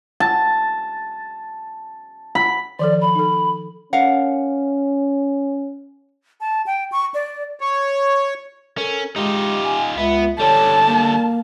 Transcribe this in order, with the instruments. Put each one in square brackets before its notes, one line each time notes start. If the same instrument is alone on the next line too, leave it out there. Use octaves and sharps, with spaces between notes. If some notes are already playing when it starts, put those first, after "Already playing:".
[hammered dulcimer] A5
B5
[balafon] D#3 F3 A4 [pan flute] D5
[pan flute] B5
[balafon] D#4 A4
[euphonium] C#4 [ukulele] A#4 F5 F#5
[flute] A5
G5
C#6
D5
[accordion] C#5
[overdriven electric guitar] C#4 [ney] A4 [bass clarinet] A#4
[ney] G#3 [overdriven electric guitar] D#4 F4 [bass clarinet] G4
[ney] G#5
[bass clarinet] C#2 [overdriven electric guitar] B3 [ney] E5
[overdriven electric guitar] D3 G3 [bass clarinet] A4 [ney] C#5 [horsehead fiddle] A5
[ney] A#3